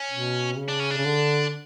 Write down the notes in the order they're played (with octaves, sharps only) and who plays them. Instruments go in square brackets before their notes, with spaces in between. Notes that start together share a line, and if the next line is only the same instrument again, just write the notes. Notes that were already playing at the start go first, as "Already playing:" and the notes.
Already playing: [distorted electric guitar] C#4
[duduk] B2
C#3
[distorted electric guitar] D4
C#4
D4
[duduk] C#3
D3